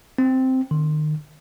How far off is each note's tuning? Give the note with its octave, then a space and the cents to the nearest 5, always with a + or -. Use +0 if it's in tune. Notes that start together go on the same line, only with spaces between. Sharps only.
C4 -5
D#3 -35